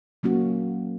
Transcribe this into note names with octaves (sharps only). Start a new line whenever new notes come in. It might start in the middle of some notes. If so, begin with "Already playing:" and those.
F#3 A#3 C#4 F#4